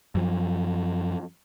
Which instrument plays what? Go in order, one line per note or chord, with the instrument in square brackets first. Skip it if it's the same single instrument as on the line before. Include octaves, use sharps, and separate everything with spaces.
[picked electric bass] F#2 F3